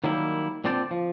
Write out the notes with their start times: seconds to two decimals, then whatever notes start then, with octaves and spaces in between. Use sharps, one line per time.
0.04 D#3 F#3 G3 A#3 E4
0.64 A#2 D3 C4 D5 G5 A5
0.91 F3